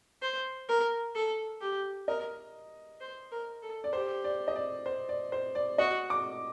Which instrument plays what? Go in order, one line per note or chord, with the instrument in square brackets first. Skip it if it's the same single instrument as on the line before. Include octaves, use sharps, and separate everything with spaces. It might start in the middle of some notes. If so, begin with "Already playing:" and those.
[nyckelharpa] C5
A#4
A4
G4
[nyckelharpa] A#4 [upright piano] D#5
[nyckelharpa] C5
A#4
A4
[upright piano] D5
[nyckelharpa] G4 [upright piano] C5
[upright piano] D5
D#5
D5
C5
D5
C5
D5
[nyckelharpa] F#4 [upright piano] D#5
[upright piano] D6